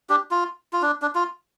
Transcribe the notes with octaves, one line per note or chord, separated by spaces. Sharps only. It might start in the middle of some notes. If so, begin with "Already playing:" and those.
D4 G4
F4
F4
D4
D4
F4